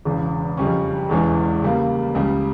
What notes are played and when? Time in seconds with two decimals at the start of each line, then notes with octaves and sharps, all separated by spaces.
0.05 E1 E2 C#3
0.57 F2 C#3 G3 C#4
1.09 E1 E2 E3 G#3 C#4
1.62 C#3 G3 A#3
2.14 C#2 C#3 G3